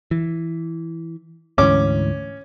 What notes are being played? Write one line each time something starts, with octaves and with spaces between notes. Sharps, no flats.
E3
D2 G#2 E3 C#4 D6